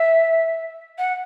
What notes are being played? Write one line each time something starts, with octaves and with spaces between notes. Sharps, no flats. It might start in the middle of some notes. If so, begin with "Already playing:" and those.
Already playing: E5
F#5